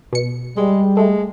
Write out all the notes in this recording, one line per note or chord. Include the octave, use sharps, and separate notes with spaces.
B2 C#7
G3 G#3
G#3 A3